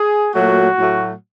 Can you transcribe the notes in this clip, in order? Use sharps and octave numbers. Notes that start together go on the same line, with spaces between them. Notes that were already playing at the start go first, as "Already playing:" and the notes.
Already playing: G#4
A#2 F#3 A3 F#4
A2 F#3 A3